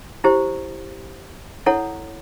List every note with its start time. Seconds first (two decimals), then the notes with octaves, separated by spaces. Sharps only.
0.24 E4 G4 C5
1.66 E4 A4 C#5 F#5